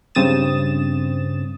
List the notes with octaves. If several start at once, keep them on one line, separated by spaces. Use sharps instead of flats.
G2 C#3 C4 D#6 A6 E7